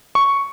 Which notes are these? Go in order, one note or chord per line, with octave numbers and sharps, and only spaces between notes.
C#6